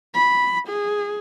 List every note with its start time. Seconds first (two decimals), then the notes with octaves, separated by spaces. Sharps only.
0.15 B5
0.68 G#4